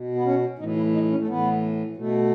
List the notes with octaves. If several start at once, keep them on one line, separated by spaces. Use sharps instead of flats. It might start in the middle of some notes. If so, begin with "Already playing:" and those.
Already playing: B2
B3
C#4
A2 E3 D#4
E4
D#4
C#4
A3
A2 E3 B3
B2 A3